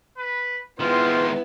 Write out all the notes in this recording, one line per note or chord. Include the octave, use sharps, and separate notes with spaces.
B4
D#3 G#3 B3 E4 F4 C5